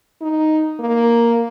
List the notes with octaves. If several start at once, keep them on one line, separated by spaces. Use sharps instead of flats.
D#4
A#3